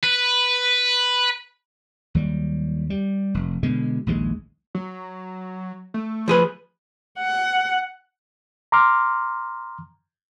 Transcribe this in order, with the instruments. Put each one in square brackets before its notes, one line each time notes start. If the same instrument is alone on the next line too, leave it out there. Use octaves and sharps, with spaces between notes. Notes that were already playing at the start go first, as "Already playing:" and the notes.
[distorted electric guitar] B4
[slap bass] D#2 F#3 G3
G3
F1
B2 D3 G#3
A#1 D#2 D3 G#3
[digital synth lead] F#3
A3
[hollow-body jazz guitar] F3 G#4 B4
[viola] F#5
[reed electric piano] A#5 C6 D6 F6